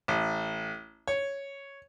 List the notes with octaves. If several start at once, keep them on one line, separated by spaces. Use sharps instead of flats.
A1
C#5